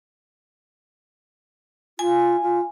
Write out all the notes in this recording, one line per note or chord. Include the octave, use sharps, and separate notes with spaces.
F4 G#5
F4